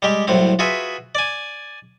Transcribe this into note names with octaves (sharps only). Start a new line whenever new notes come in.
G3 G#3 G4
C2 A2 F#3 C4
F4 F#4 G#4 B4 E5
D5 G#5